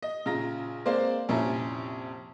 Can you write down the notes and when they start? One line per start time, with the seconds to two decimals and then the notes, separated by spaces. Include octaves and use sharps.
0.03 D#5
0.26 A#1 C#3 F4 A#5 A#6
0.85 G#3 A#3 C4 C5 D5 F5
1.29 A#1 F2 C3 C#4 E4 A#5